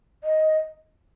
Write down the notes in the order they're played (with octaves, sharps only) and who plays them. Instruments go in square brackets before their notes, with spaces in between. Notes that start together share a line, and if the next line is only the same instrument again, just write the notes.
[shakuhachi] D#5